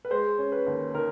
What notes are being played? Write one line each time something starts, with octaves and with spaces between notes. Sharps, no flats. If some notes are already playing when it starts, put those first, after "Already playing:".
B4
G#3 C5
C#4
B4
D#2
D#3 A#4